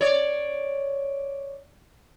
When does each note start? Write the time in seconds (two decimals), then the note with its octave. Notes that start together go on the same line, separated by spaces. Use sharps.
0.01 C#5 D5